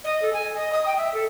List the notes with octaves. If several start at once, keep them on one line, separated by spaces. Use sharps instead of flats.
D#5
A4
G#5
D#5
D#6
G5
E5
A4